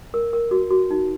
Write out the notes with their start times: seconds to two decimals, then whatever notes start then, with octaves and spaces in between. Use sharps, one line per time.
0.14 A#4
0.33 A#4
0.51 F#4
0.71 F#4
0.91 D#4